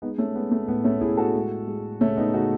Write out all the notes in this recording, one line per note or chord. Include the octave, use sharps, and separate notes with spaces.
G#3 B3 D#4
A3 C#4
G#3 B3
A3
A2 B3
A3 C#4
A2 E4 G#4
F#4 A4
G#3
G#3
C#3 A3 C#4
B3 D#4
C#3 D#4 F#4